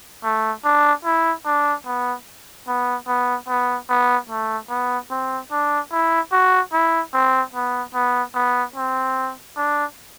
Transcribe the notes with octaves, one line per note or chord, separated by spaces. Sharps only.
A3
D4
E4
D4
B3
B3
B3
B3
B3
A3
B3
C4
D4
E4
F#4
E4
C4
B3
B3
B3
C4
D4